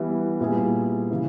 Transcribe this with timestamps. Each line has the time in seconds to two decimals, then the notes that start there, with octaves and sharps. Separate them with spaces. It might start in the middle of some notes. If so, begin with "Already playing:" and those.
Already playing: E3 G3 B3 E4
0.40 A#2 G3 B3 E4 G#4
1.11 C#3 E3